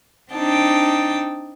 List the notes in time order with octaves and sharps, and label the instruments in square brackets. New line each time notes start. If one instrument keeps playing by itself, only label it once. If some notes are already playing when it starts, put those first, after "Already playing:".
[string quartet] C4 D4 D#4 G5 A5